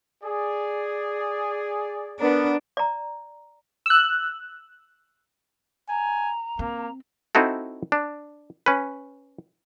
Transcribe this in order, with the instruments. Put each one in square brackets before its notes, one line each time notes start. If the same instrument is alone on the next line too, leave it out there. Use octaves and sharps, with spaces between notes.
[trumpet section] G#4 D5
[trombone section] B3 A#4 [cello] D4
[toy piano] D5 A#5
[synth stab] E6 F#6
[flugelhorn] G#5 [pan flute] A#5
[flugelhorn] A#3 [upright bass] C4
[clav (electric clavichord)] C4 D#4 E4 F#4 A4
D4
C#4 B4